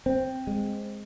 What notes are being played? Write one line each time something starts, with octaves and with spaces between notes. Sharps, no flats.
C4
G#3